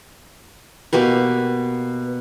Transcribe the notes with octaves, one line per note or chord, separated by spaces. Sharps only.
B2 A#3 G4 B4